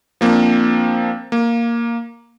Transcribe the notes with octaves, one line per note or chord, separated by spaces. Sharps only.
F3 A#3 C4 D4
A#3